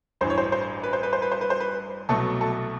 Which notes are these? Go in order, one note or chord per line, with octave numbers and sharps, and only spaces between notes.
A1 G2 E3 C5
C#5
C5
C5
B4
C5
B4
C5
B4
C5
B4
C5
B4
C2 B2 F#3 A3 A4
A4